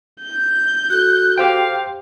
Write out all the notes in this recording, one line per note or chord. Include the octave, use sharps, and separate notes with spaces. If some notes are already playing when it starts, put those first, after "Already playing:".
G6
F#4 A4 F#6
G4 C5 F5 G5